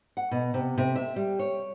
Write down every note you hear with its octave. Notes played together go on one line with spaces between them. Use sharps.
F#5
B2
C3
C3
E5
G3
C#5